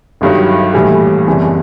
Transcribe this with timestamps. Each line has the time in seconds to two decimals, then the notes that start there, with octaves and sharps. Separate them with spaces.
0.21 G1 G2 D#3 F#3
0.74 A#1 A2 E3 G3
1.27 F#1 E2 C3 E3